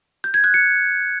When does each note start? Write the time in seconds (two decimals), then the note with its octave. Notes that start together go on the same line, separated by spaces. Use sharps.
0.24 G6
0.34 G#6
0.44 F#6
0.54 C#7